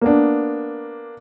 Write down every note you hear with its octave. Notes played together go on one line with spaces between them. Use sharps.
A#3 B3 D4